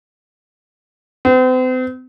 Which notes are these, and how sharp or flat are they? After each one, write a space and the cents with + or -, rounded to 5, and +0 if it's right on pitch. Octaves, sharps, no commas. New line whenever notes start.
C4 -40